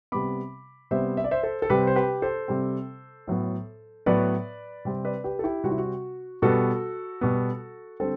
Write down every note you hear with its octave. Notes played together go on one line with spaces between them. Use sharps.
C3 G3 B3 B5 D6
C3 G3 B3 C5 E5
E5
D5
C5 E5
A4 C5
A4
C3 G3 C4 G4 B4
C5
G4 B4
A4 C5
C3 G3 C4
A2 F#3 B3
A2 F#3 B3 B4 D5
C3 G3 C4
B4 D5
G4 B4
A4
E4 G4
C3 G3 C4 F#4
E4
F#4
B2 G3 B3 F#4 A4
B2 G3 B3
D3 G3 C4 A4 C5